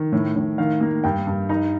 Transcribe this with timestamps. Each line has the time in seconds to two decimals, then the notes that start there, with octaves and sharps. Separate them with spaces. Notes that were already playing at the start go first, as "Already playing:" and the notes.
Already playing: D#3
0.12 A2
0.36 A2
0.58 D#3 F5
0.81 A#3
1.04 G2 G5
1.27 G2
1.49 D#4 A#5